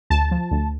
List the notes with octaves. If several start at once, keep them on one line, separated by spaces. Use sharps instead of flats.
D2 A5
F3
D2